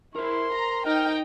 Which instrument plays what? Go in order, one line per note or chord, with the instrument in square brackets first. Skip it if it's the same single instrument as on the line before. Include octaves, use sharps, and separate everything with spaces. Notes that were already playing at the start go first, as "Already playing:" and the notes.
[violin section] E4 [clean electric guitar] A#4 C5 [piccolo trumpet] C6
[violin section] A#5
[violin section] D#4 G5 [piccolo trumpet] F6